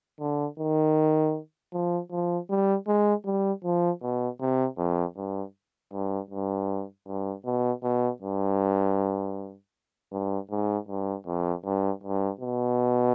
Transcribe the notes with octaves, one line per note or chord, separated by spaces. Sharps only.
D3
D#3
F3
F3
G3
G#3
G3
F3
B2
C3
F2
G2
G2
G2
G2
B2
B2
G2
G2
G#2
G2
F2
G2
G2
B2